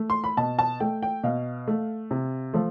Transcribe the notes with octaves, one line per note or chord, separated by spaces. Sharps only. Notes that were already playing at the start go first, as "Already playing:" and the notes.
Already playing: A3
C6
B5
B2 A5
A5
A3 G5
G5
B2 F5
A3
C3
F3 A3